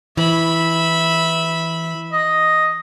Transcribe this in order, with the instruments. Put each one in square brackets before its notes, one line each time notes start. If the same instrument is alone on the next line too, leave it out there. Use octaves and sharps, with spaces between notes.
[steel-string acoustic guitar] E3 [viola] E5 B5
[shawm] D#5